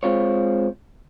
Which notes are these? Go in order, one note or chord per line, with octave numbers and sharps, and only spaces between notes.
G#3 C4 F4 C#5